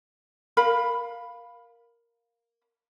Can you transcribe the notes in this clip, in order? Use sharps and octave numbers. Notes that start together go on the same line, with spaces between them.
A#4 F5 B5